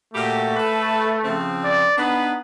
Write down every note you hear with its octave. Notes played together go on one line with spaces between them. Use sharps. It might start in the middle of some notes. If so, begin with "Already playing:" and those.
A#2 A3 F#4 G4
A4 B4
C#3 F3 C4
D5
B3 D4 D#4 B4